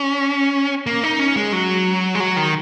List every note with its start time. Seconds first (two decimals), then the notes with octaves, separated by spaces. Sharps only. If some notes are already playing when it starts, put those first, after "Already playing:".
Already playing: C#4
0.86 A#3
1.03 D#4
1.19 C#4
1.36 G#3
1.53 F#3
2.15 G#3
2.20 F#3
2.37 D#3